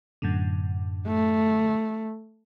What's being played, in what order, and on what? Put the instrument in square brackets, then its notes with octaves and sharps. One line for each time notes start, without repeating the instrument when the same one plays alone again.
[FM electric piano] F#2 A2 D3
[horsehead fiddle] A3